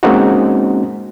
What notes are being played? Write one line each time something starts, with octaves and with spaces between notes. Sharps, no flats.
G#3 A#3 C4 C#4 D#4 F#4